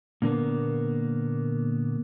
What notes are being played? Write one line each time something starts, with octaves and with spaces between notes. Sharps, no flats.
A#2 D3 A#3 B3